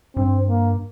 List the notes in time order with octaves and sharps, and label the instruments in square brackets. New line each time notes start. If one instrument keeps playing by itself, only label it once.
[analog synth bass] G2 [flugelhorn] C4
[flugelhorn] A#3